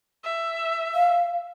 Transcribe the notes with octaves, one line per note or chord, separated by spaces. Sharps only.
E5
F5